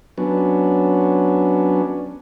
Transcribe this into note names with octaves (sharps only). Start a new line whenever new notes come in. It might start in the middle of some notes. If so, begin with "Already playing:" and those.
F#3 B3 C#4 D4